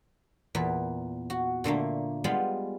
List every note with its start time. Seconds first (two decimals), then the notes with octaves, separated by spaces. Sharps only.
0.55 E2 A#2 B4
1.30 F#4
1.64 A#2 D3 A3 A#3
2.24 G3 G#3 B3 F4